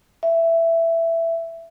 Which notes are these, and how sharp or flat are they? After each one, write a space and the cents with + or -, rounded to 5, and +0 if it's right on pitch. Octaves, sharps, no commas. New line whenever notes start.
E5 +10